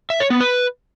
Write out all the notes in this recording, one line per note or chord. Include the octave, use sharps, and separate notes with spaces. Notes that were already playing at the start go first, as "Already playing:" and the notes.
E5
C#5
B3
B4